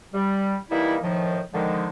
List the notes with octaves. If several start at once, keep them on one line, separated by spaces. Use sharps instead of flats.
G3
E3 G3 A#3 D#4 E4
A2 D#3 F3
D3 D#3 F3 G#3